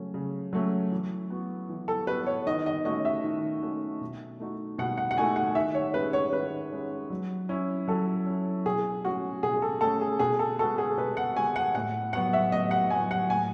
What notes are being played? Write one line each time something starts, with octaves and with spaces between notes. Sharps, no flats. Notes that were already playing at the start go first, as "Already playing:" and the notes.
Already playing: C#3 F#3 A3 C#4
C#3
F#3 A3 C#4
E3
B3 F#4
E3
A4
B3 F#4 B4
C#5
D#3 D#5
D#5
A3 C#4 F#4 D#5
E5
D#3
A3 C#4 F#4
B2
A3 D#4 F#4
B2 F#5
F#5
F#5
A3 D#4 F#4 G#5
F#5
D#3 E5
C#5
G#3 C#4 B4
C#5
D#3 B4
G#3 C#4
F#3
C#4 E4
F#3 A4
C#4 E4
B2 G#4
A3 C#4 F#4
B2 G#4
A4
A3 C#4 A4
G#4
B2 G#4
A4
G#3 B3 F#4 A4
G#4
B2 B4
F#5
G#3 B3 F#4 G#5
F#5
A2 F#5
F#3 B3 F#4 F#5
E5
A2 D#5
F#5
F#3 B3 F#4 G#5
F#5
A2 G#5